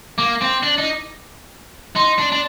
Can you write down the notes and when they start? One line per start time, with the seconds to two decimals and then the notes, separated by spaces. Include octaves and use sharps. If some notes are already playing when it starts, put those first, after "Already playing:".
0.18 A#3 D6
0.41 C4
0.63 D4
0.78 D#4
1.95 D#4 C6
2.18 D4
2.32 D4